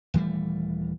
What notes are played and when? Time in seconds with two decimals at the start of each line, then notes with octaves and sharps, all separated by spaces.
0.14 D#1 E3 G3 A3